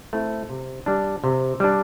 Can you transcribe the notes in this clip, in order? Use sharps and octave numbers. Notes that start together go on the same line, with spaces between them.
A3 C4 E4
C3
G3 D4
C3
G3 D4